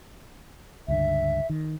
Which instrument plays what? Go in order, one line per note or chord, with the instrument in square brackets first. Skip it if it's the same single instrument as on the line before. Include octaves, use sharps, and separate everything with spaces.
[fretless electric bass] C#2 G2 D3 [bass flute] E5
[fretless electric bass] D#3